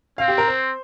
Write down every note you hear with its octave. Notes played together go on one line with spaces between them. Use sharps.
C4 F5
G4
A#4
C5